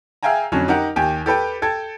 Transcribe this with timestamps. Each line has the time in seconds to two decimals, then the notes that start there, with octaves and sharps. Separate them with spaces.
0.23 G#4 E5 F5 G5 G#5 A#5
0.52 F2 D3 F#3 C#4
0.68 D#4 G4 A#4 F#5
0.96 D#2 G4 G5 G#5
1.26 G4 A4 B4 G5
1.62 A4 G5 A5 G#6